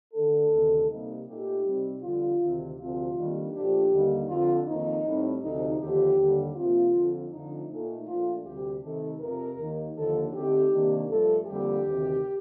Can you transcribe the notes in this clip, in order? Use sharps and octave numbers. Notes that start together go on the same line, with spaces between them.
D3 A3 D4 A4
D2 C3 D#3 A3
C3 G3 A#3 D#4
A#2 A3 D#4 G4
C3 G3 C4 D#4
F2 D3 G3 F4
D2 C3 D#3
D2 C3 F3 C4 F4
F2 D#3 G3 A#3 D4
A#2 F3 A3 D4 G4
D#2 D3 G3 A#3 D#4
F2 D3 F3 F4
F2 D#3 A#3 D#4
A2 G3 C4
D2 C3 F3 A3 D#4
D#2 D3 F3 G4
D#2 D3 G3 D4
C3 F3 A#3 F4
F2 D3 F3
F2 D3 F3 A3 D4 D#4
A#2 A3 D#4
A#2 F3 A3 D4 F4
D2 C3 G3 G4
C3 D#3 A3 D#4 A4
F2 C3 F3 A#4
D#2 D#3 A#3 D#4
D#2 D3 F3 A#3 D#4 A4
D3 A3 C4 D#4 G4
C3 D#3 A#3 D4
G2 F3 A3 A4
F2 D3 G3 A#3 G4
D2 C3 D#3